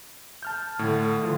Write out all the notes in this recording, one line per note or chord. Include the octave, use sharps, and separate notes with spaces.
A5 F6 G6
A2 D3
D3 E3 F3 F4